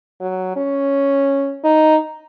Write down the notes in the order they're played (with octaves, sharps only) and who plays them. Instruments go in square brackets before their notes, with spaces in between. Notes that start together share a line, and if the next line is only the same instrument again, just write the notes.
[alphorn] F#3
C#4
D#4